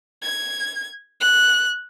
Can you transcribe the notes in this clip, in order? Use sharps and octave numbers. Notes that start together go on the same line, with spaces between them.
G#6
F#6